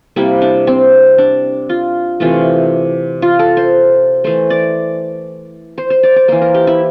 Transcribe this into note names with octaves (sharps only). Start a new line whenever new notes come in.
C3 G3 A#3 E4
D4
C4
D4
F4
C3 E3 A3 F4
F4
A4
C5
E3 A3 C5
D5
C5
C5
D5
D5
E3 A#3 C5
A#4
G4
E4